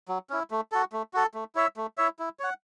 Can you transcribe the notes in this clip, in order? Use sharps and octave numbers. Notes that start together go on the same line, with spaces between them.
F#3
C#4 E4
A3
F#4 A4
A3
F#4 A4
A3
E4 C#5 E5
A3
E4 C#5 E5
E4
C#5 F#5